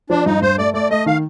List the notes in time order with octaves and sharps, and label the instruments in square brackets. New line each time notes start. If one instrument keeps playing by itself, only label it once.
[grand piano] F3 [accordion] D4
[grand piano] G2 [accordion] D#4
[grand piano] G2 [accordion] C5
[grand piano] A3 [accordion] D5
[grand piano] A3 [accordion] D5
[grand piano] A3 [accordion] D#5
[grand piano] D#3 [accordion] F5